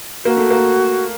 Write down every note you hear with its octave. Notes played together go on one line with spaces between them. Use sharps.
A#3 F#4
A3
A#3